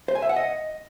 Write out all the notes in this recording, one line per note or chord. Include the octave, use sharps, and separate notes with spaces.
C5
G#5
E5
F#5
D#5